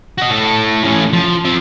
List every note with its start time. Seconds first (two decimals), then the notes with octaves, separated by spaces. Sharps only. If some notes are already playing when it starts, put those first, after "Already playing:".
0.18 F#4 D#5
0.31 A2 A4
0.84 A2 C#4
1.13 F3
1.45 F3 C4